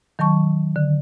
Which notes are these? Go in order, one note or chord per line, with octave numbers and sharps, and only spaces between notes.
D#3 F#3 A5 C#6
D3